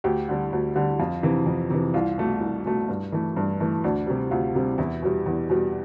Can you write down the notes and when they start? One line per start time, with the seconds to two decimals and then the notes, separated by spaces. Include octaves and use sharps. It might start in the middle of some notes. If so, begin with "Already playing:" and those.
0.04 D2 G4
0.28 D3 G3
0.53 D2
0.75 D3 G3
1.00 F2 F4
1.23 C3 E3
1.46 F2
1.70 C3 E3
1.94 C2 F4
2.18 B2 A3
2.41 C2
2.65 B2 A3
2.88 G2
3.12 E3 A3
3.36 G2
3.60 E3 A3
3.84 D2 D4
4.07 C3 G3
4.31 D2 F4
4.55 C3 G3
4.78 E2 E4
5.02 B2 G3
5.26 E2
5.50 B2 G3